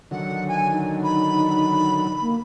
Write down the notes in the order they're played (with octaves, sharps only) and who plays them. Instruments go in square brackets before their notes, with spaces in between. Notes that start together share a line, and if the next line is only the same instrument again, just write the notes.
[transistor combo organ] D3 D#3 F#3 [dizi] F#5
[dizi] G#5
[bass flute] D#4
[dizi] B5
[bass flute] A#3